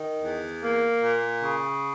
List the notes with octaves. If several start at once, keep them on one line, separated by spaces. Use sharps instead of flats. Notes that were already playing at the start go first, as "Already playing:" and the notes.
Already playing: D#3
E2
A#3
A#2
C#3